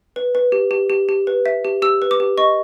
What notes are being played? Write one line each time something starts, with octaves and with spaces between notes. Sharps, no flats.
B4
B4
G4
G4
G4
G4
B4
E5
G4
G4 E6
B4
D6
G4
D#5 C#6